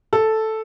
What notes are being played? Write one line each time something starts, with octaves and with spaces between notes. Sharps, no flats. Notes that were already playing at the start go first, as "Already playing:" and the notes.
A4